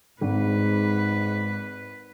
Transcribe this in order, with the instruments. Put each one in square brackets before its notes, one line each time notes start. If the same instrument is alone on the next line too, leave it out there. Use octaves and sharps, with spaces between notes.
[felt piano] G#1 [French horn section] G#2 [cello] B4